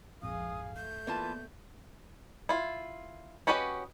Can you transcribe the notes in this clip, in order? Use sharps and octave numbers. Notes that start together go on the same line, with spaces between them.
A#1 F2 G#2 G#4 F5 D#6
A3 G6
E3 A#3 B3 F4 D5 A5
E4 F4
C#4 F#4 G4 B4 D#5